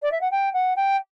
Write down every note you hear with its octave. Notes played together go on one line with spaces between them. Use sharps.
D5
E5
F#5
G5
F#5
G5